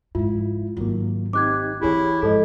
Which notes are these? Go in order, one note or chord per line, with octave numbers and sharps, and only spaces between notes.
F2 G#2 E4 F4
G#1 F#3 A#3
C4 D#4 G4 D6 F#6 G#6
F2 E3 E4 G4 G#4 C#5
G#2 F3 A4 D#5